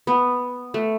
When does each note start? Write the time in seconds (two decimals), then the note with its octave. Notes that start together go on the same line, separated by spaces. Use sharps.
0.07 B3
0.74 A3